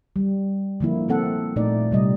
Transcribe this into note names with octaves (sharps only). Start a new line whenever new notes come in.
G3
D3 F3 A#3 E4
A#3 C4 A4 F#5
A#2 A3 D#4 D5
C3 G3 D#5